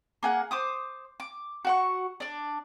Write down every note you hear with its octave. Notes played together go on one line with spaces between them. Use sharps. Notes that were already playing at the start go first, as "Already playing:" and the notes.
A#3 G#4 F#5
C5 D6 D#6
D6
F#4 F#5 C#6
D4 D5